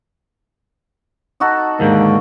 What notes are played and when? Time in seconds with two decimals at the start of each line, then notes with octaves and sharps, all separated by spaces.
1.40 D#4 F#4 A4
1.80 D#2 G#2 D3 A#3